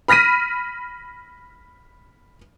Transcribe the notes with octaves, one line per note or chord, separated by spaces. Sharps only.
B5 F6 A#6 B6 D#7